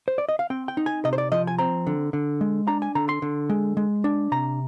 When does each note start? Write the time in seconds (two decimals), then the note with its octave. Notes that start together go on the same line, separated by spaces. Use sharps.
0.08 C5
0.18 D5
0.29 D#5
0.39 F5
0.50 C4 G5
0.68 G5
0.77 D#4
0.86 G#5
1.05 C3 D#5
1.13 C5
1.18 D5
1.32 F3 D#5
1.47 G#5
1.58 C4 A#5
1.87 D3
2.13 D3
2.41 G#3
2.68 D4 A#5
2.82 G#5
2.95 D3 A#5
3.09 C6
3.22 D3
3.50 G#3
3.77 G#3
4.04 D4
4.32 C3 A#5